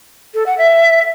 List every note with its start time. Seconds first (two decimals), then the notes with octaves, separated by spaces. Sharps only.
0.34 A4
0.46 F#5
0.58 E5